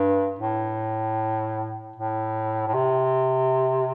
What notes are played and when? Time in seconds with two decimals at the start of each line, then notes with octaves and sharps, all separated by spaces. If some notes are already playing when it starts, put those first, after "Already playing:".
Already playing: G2
0.39 A2
1.96 A2
2.68 A2
2.74 C3